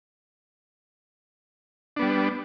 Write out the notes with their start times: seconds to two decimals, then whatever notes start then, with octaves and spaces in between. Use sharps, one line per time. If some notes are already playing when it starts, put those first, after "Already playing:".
1.96 D4
1.99 B3
2.02 G3